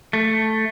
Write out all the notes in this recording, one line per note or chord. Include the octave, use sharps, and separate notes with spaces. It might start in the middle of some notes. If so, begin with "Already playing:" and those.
A3